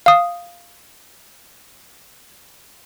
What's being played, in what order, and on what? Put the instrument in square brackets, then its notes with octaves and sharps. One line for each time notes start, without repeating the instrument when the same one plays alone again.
[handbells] F5 D#6